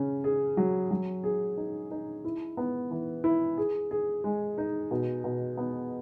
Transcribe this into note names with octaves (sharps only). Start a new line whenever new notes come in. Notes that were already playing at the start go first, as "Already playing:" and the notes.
Already playing: C#3 C#4
G#4
F#3
F#3
G#4
D#4
D#4
E4
B3
E3
E4
G#4
G#4
G#3
D#4
B2
B2
B3